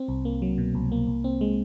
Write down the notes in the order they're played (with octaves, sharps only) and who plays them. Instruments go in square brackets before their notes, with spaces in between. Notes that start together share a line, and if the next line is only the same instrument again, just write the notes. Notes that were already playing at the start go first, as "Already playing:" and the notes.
Already playing: [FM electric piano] C4
C2
A#3
F#3
B2
C2
A#3
C2
C4
G#3